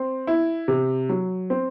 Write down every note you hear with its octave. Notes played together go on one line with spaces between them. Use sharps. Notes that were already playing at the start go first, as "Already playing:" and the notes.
Already playing: C4
E4
C3
F#3
C4